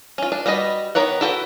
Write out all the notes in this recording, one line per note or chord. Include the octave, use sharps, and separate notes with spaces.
C#4 F4
D4
G3 F#4 B4 D#5
D#3 B3 A#4 C#5 F#5
E4 F#4 A4 B4 G5